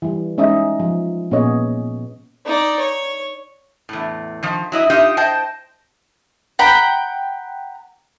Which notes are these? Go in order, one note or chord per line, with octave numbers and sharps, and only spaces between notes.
E3 G3
G#3 C#4 D#4 D#5 E5
F3
A#2 B3 C#4 G#4 C#5 D#5
D#4 D5
C#5
E2 A2
D#3 F3
F#3 E4 D#5
D#4 F4 G4 D#5 E5
C5 D#5 G5 A5
F#5 G5 A#5 B5